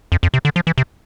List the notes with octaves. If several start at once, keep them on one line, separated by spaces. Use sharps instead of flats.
F2
F2
C3
D3
F3
E3
C3